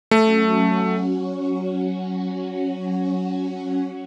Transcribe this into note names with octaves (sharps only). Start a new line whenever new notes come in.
F#3 A3 C#4 F#4